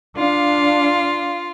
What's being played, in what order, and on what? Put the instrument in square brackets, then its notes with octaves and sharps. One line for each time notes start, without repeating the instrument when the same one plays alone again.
[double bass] D4 [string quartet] F4 F5